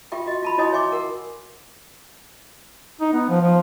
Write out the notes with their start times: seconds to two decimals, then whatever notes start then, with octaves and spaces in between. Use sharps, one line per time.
0.12 F4 G4 E5 G5
0.26 F#4 D#5
0.43 F4 A5 B5
0.58 E4 F#4 C#5 D#5 G#5 D#6
0.72 C#5 E5 G#5 C6 D6
0.92 A#4 F#5
3.01 D#4
3.13 B3
3.29 F3
3.42 F3